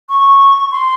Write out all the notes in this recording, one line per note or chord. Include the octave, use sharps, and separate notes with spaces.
C#6
C6